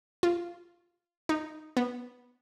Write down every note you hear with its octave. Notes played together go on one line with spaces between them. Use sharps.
F4
D#4
B3